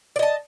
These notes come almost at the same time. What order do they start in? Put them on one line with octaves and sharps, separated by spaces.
D5 D#5 A5